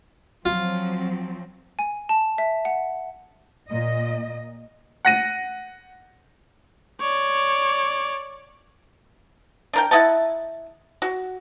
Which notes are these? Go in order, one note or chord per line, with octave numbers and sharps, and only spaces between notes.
F3 F#3 C4 F4
G#5
A5
E5
F#5
A#2 D#5
F#5 A#6 D#7
C#5 D5
D4 A#4 G5
E4 D#5 F#5 A5
F#4